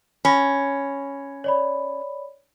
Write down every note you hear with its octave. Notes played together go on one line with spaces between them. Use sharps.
C#4 B5 A#6
C#5 D5 B5